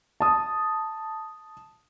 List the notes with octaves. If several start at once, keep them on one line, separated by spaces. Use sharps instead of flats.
A5 D#6